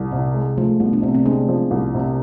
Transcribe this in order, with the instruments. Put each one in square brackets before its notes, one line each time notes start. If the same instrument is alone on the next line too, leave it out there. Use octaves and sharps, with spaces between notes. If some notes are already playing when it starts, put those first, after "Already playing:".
Already playing: [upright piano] C2
[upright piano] C3 [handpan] E4
[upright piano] G#3
[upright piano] F3 [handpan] A3
[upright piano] C2 [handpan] B3
[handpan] D4
[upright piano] C3 [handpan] C4
[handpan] C4
[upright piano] G#3 [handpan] D4
[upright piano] F3
C2
C3